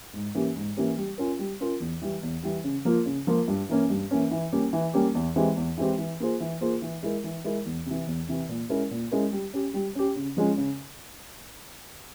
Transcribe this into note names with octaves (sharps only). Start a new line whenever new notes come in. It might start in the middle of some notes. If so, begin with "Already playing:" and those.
G#2
E3 A#3 C#4 G4
G#2
E3 A#3 C#4 G4
G3
C#4 F4 A#4
G3
C#4 F4 A#4
E2
E3 G3
E2
E3 G3
C#3
F3 A#3 F4 A#4
C#3
F3 A#3 F4 A#4
G2
E3 A#3 C#4
G2
E3 A#3 C#4
E3
G3 A#3 C#4 G4
E3
G3 A#3 C#4 G4
E2
E3 G#3 C4 G4
E2
E3 G#3 C4 G4
E3
A#3 F4 G#4 C5
E3
A#3 F4 G#4 C5
E3
G#3 E4 A#4
E3
G#3 E4 A#4
E2
C3 E3
E2
C3 E3
A#2
G#3 C#4 E4 A#4
A#2
G#3 C#4 E4 A#4
G3
C#4 G4
G3
C#4 G4
C#3
F3 G#3 C#4
C#3